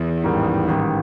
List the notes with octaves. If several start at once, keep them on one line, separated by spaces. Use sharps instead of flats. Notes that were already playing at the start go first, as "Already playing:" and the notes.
Already playing: E2
A1 G#2 D#3 G3
A1 G#2 D#3 G3